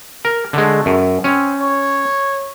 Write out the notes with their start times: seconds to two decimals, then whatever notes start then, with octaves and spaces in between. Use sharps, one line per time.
0.25 A#4
0.53 D3 G#3 A3
0.86 F#2
1.24 C4 C#4
1.61 C#5